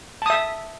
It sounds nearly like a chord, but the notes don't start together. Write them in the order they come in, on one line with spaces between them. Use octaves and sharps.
A5 D#6 E5